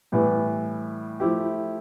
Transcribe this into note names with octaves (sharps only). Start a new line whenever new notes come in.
A2 E3 G3 B3 E4
F3 A3 E4 G4